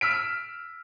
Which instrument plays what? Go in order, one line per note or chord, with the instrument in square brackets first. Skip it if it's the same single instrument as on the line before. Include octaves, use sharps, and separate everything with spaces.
[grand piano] E6 F6 B6 D7